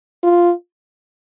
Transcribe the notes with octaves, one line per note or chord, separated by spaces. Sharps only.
F4